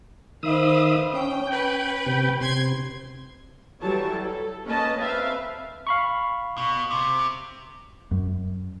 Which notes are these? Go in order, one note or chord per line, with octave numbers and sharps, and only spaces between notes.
D#3 B4 C5 E5 F5 D#6
C#4 G5
C#4 B4 G5
C3 G5
C3 C6 G#6
E3 F#3 G3 A4 C#5 A5
A4
A#3 C#4 B4 D#5 A5
C4 B4 E5 F5
F5 B5 C#6
B2
C3
F#2